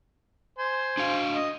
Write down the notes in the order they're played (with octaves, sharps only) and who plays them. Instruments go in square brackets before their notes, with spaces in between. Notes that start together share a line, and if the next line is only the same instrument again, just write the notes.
[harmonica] C5 G#5
[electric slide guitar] D4 F#4 F5
[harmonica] D#5